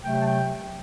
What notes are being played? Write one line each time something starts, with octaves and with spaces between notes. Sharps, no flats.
C3 F#3 A3 G5
A5
G5